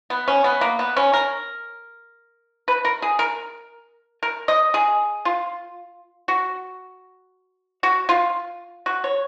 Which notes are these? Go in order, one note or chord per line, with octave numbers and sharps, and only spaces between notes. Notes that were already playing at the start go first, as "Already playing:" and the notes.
B3
C#4
B3
A#3
B3
C#4
A#4
B4
A#4
G#4
A#4
A#4
D#5
G#4
F4
F#4
F#4
F4
F#4
C#5